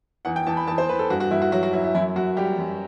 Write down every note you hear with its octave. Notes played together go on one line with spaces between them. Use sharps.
E2 F#5
G5
E2 A5
B5
E2 A5
C5
E2 B4
A4
G2 F#4
F#4
G2 E4
F#4
F#3 F#4
F#4
F#3 E4
E4
F#2 E4
F#2 F#4
G3 G4
F#2